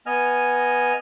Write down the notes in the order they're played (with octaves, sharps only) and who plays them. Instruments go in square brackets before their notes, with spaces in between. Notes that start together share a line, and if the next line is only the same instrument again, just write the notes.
[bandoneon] B3 D#5 G#5 F6